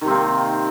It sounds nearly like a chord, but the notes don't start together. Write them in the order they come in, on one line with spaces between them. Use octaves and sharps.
D#3 C3 C4 A#3